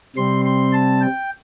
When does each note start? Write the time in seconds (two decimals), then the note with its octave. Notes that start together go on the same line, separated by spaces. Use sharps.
0.16 C3 G3 C4 C6
0.45 C6
0.73 A5
1.01 G5